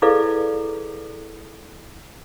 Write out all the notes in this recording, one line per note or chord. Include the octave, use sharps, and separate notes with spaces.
E4 G#4 A4 B4 D5 F5